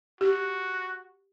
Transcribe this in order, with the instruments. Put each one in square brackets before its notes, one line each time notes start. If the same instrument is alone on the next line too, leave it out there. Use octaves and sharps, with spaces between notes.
[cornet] F#4 [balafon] G4